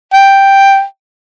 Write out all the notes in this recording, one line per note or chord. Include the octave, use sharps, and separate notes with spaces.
G5